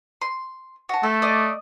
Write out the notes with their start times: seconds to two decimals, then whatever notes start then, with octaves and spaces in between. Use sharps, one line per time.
0.22 C6
0.89 F#4 A5
1.03 A3 A4
1.22 D5 D#5